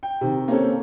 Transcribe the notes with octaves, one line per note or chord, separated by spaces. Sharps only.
G5
C3 D#3
A#3 C4 C#4 A4